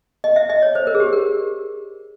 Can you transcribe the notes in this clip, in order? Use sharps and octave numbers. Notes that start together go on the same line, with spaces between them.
D#5
E5
D#5
C#5
C5
A#4
G#4
G4
A#4